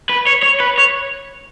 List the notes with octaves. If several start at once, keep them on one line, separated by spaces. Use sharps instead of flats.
B4
C#5
C#5
B4
C#5